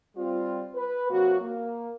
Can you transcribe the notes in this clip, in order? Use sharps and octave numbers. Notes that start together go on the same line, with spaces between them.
G3 C4 F4
B4
C3 F#3 A#3 F#4
A#3